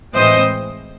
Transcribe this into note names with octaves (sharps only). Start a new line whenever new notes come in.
A2 E3 G#3 C4 C5 D#5